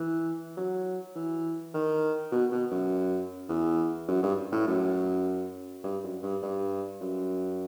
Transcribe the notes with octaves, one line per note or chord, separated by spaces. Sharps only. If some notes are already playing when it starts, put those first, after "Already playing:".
Already playing: E3
F#3
E3
D#3
B2
B2
F#2
E2
F#2
G2
A2
F#2
G2
F#2
G2
G2
F#2